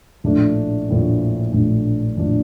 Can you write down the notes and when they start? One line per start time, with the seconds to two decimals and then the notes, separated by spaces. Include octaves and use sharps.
0.24 A#1 A2 A3 D4
0.88 A#1 A2 A3 D4
1.53 A#1 A2 A3 D4
2.17 A#1 A2 A3 D4